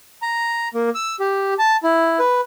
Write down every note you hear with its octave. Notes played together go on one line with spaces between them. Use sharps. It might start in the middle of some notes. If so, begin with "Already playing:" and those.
A#5
A#3
E6
G4
A5
E4
B4